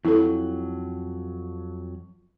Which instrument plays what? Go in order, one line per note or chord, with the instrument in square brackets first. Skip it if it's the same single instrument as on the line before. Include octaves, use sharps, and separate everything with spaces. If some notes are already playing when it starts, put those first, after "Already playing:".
[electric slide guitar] F2 F#3 [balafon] E4 A4